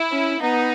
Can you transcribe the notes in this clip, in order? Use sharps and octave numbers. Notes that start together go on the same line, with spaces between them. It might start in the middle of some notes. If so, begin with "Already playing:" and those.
Already playing: E4
C#4
B3 D#4